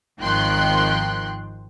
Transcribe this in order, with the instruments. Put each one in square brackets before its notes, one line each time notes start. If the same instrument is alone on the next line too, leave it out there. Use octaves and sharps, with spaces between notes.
[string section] G#1 D#3 F3 G5 C6 F#6